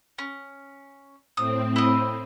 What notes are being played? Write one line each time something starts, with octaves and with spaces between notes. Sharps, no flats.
C#4
A2 C4 D#6
E4 D#5